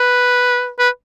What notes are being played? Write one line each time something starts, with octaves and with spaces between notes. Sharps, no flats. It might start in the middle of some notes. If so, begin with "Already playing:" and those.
Already playing: B4
B4